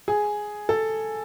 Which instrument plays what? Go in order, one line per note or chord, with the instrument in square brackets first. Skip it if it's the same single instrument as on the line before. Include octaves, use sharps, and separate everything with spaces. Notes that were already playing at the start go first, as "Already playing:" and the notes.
[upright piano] G#4
A4